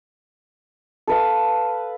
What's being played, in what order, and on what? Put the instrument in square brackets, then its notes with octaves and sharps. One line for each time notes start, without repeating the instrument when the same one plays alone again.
[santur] A4 B4 F5